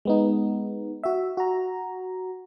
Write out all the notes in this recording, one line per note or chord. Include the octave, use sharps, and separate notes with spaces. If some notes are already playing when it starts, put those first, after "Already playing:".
G#3 B3 D#4
F#4 E5
F#4 A#5